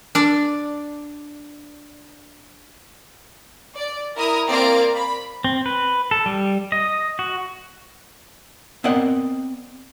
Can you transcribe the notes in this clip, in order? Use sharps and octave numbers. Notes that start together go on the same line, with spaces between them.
D4 D5
D5
E4 A#4 A#5 D#6
A#3 C4 A#4 D5 F5 D7
B5
C4
B4
A4
G3
D#5
F#4
B3 C4 A#4 D5 D#5 F#5